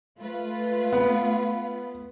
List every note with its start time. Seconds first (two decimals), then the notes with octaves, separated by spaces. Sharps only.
0.18 A3 F4 B4
0.93 B3